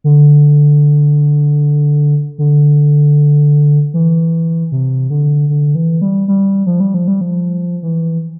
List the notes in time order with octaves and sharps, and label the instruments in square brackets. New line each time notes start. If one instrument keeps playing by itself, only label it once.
[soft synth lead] D3
D3
E3
C3
D3
D3
E3
G3
G3
F3
G3
F3
G3
F3
E3